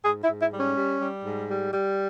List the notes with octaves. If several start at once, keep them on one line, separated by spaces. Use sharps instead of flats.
G#2 G#4
E4
G#2
E4
G3
C#4
G3
G3
G#2
G3
G3